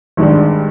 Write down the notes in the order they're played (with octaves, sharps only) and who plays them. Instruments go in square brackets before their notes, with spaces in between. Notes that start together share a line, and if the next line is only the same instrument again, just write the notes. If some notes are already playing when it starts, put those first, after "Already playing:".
[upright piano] G#1 G2 D#3 G#3 D4